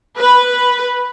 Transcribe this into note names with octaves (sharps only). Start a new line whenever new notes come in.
B4